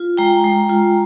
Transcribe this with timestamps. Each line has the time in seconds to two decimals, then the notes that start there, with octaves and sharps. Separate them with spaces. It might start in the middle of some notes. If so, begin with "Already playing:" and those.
Already playing: F4
0.17 G#3 G5 A#5
0.44 G#3
0.69 F4